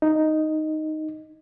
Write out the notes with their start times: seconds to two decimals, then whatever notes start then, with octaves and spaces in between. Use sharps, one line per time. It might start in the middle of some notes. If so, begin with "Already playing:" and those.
0.02 D#4